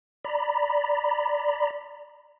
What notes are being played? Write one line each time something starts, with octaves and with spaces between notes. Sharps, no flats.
D5 A#5 B5